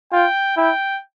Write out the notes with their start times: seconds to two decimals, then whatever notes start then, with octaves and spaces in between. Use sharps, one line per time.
0.12 F4 G5
0.57 E4 G5